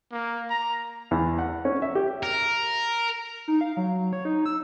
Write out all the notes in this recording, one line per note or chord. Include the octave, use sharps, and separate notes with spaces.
A#3
A#5
E2
F#5
C#4
E5
G4
A#4
D#4
F5
F#3
C#5
D#4
E6